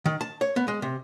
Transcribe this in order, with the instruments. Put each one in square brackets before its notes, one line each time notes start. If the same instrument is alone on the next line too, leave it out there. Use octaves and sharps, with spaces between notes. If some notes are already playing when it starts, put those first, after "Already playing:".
[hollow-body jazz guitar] D#3
A5
C#5
B3
G#3
C3